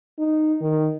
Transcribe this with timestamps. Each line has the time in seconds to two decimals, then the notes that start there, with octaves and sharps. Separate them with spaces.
0.19 D#4
0.61 D#3